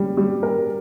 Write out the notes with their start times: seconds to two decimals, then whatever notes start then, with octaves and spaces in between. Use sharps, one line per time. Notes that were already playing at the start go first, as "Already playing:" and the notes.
Already playing: G3 C#4
0.17 G3
0.43 A#4